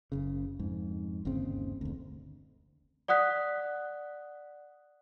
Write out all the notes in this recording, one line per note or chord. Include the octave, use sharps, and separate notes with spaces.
F#1 C#3
F2 G#2
G1 D#2 C#3 C4
E1 D2
D5 F#5 D#6 F#6 B6